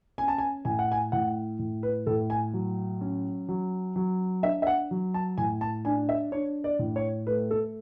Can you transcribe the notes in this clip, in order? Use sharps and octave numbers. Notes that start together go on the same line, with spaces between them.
C#4 G#5
A5
G#5
A2 G#5
F#5
G#5
A2 F#5
A2
B4
A2 A4
G#5
F#3
C#4
F#3
F#3
D4 E5
E5
F#5
F#3
A5
A2 G#5
A5
D4 G#5
E5
D4 C#5
D5
A2
C#5
A3 B4
A4